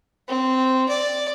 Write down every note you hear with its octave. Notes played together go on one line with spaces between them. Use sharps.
C4
D5